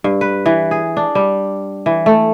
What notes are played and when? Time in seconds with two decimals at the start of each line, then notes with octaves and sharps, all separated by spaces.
0.04 G2
0.21 B4
0.46 E3
0.71 G#4
0.97 D4
1.15 G3
1.86 E3
2.06 A3